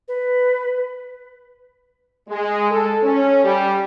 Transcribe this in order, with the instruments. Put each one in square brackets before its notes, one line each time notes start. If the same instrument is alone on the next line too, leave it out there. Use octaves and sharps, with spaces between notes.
[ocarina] B4
[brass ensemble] G#3
A4
C#4
G3